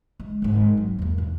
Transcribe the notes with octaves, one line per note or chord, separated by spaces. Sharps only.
G#3
G#1 G#2
F#3
E2 A#3
E2